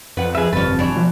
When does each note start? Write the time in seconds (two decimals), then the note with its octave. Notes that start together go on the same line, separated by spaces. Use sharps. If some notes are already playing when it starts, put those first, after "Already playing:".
0.17 F2 B4 F#5
0.35 G#4 B4 E5
0.53 G1 F2 C3 C#4 B4 A5
0.79 E3 D4 C#5
0.95 B2 F3